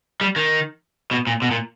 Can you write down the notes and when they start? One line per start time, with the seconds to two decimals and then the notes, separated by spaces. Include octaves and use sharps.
0.21 G3
0.36 D#3
1.11 B2
1.27 A#2
1.42 B2
1.51 A#2